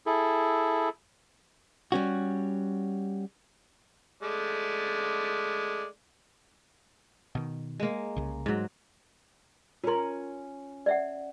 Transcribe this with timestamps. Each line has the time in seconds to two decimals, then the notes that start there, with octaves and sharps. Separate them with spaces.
0.06 E4 G#4 A4
1.92 G3 C#4 F#4
4.22 G#3 A3 D5
7.35 B2 D#3
7.80 G#3 A#3
8.16 C2 C#3
8.46 G#2 F#3
9.84 C#4 F4 A#4 C6
10.86 D5 E5 F#5